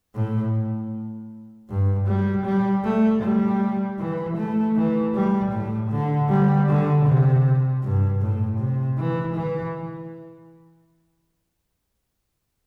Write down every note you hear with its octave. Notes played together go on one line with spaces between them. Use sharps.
A2
G2
G3
G3
A3
G3
E3
A3
E3
G3
A2
D3
G3
D3
C3
G2
A2
C3
E3
E3